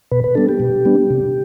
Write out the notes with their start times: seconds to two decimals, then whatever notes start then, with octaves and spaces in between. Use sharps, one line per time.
0.11 B2 B4
0.24 B4
0.35 G3 B3 D4 A4
0.49 G4
0.60 B2
0.85 G3 B3 D4
1.10 C3